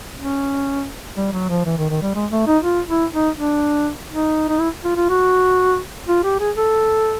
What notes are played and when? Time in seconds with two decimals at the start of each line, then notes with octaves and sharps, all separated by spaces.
0.18 C#4
1.16 G3
1.33 F#3
1.49 F3
1.66 E3
1.78 D#3
1.90 D#3
2.02 G3
2.15 G#3
2.31 A3
2.47 D#4
2.63 F4
2.88 E4
3.13 D#4
3.37 D4
4.10 D#4
4.49 D#4
4.60 E4
4.84 F4
4.96 F4
5.09 F#4
6.08 F4
6.24 G4
6.40 G#4
6.57 A4